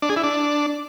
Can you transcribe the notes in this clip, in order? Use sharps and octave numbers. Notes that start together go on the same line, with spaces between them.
D4
G#4
E4
D4